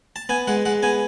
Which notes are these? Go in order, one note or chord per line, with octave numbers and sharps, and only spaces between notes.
A5
B3 G#5
G#3 F#5
G#3 F#5
B3 G#5